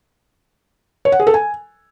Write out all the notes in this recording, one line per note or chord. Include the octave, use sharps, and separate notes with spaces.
C#5
F#5
G#4
A4
G#5